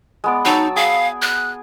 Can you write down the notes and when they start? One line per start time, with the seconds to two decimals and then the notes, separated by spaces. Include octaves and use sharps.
0.24 G#3 B3 D5
0.45 F#3 D#4 A5 E6
0.76 G#4 F5
1.22 F#6